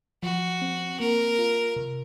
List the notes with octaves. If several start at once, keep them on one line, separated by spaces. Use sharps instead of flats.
F3 F#4
C4
A#3 A#4
F4
C3